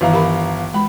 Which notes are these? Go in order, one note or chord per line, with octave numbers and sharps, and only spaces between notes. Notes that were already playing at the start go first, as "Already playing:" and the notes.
G1 D#3 E3 E4 F5 A#5
G4 A#4 B5
G#3 B5